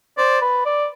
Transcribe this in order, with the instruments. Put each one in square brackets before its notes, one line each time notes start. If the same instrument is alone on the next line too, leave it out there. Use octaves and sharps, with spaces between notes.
[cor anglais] C5 [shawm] D5
[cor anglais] B4
D5